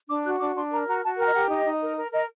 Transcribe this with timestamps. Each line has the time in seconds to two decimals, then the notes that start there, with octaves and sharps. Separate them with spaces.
0.09 D4 D6
0.25 F#4 F#6
0.40 D4 D6
0.55 D4 C6
0.71 A#4 A#5
0.87 F#4 A#5
1.03 F#4 A5
1.18 A#4 G5
1.27 D#5
1.34 G4 F#5
1.49 D#4 D#5
1.65 D#4
1.81 A#4
1.96 A#4
2.12 A#4 D#5